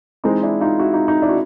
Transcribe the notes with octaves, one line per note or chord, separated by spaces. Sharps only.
E3 G#3 C4 D#4
D4 E4
D#4 F4
E4 F#4
D#4 F4
D#4
D4 E4
F#4